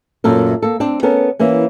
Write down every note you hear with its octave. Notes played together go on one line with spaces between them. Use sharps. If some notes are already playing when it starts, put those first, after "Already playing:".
F#2 A#2 A4 A#4
A#3 A4
C4 D4
B3 C#4 A4 A#4
E3 A#3 C#4